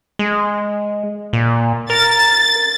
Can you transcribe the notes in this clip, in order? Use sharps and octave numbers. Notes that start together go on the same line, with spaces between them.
G#3
A#2
A#4 A6